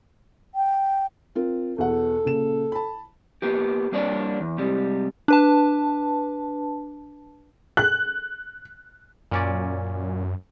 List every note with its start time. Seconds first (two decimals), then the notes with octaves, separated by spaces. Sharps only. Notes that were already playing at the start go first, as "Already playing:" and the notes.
0.55 G5
1.35 C4 F4 A#4
1.78 E2 B2 A4 F#5
2.25 A#2 C#3 E7
2.72 A5 B5
3.42 A#3 B3 G4
3.92 G3 A#3 D4 D#4 C#5 D5
4.40 E2
4.58 C3 G3 G#3
5.28 D4 B4 A5
7.77 F#6
9.31 F#2 A#2 C#4 D5